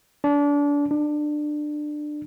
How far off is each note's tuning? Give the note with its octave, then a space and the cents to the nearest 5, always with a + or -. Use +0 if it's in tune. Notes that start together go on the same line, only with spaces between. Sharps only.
D4 -30
D4 +20